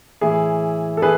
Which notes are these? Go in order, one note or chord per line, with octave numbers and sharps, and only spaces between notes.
A2 E3 E4 G#4
A4
E3 G#4 B4